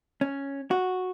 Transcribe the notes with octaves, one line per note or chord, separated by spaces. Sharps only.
C#4
F#4